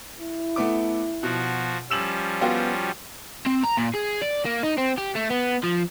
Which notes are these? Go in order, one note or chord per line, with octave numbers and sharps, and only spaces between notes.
E4
A3 B3 D6
B2 F3 F#4
F3 G3 C#4 E6 E7 F#7
B3 F4 F#4 G5
C4
A#5
A#2
G#4
D5
A#3
D#4
C4
G4
A3
B3
F3